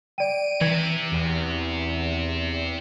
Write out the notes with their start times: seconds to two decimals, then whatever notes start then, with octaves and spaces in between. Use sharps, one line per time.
0.18 D5 G5 D7 D#7
0.61 C3 E3 G#6
1.12 E2